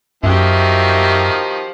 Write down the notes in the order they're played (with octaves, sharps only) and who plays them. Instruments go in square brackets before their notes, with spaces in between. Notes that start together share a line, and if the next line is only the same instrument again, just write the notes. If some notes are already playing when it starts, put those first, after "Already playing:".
[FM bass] F#2 [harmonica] D#3 F3 [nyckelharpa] F#4 G4 [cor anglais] E5